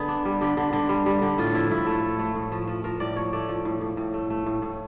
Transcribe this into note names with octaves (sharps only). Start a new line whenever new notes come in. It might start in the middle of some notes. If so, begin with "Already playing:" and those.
Already playing: D3 B3 G#4
D4
G3
D3 G4
D3
D3
G3
G3
D3
A2 F4
F3 E4
A2 E4
A3 A4
A3
A3
A2
F3
F3
F3 A#4
A2 D5
F3 C#5
A3 D5
F3
A2
A2
A2
A3
A3
A2
A2